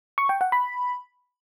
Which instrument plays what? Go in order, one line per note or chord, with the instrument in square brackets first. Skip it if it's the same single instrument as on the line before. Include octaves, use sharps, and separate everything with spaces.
[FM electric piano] C#6
G5
F#5
B5